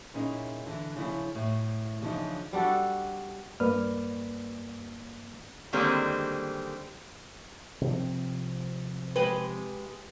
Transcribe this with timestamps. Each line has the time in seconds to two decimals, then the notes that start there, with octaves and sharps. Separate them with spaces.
0.14 A#2 C#4 D#4 E4 G#4
0.66 D3 E3
0.96 C#3 F3 E4 E5
1.35 A2
2.02 C#3 E3 F3 D4 D#4
2.53 G3 D4 F#4 A4
3.60 G2 A#3 B4 D5 F6
5.73 D3 D#3 G3 G#3 A#3 C4
7.81 C3 F3 C4
9.16 G#3 G4 B4